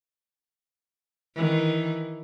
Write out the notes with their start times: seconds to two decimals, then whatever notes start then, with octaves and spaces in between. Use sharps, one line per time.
1.35 D#3 E3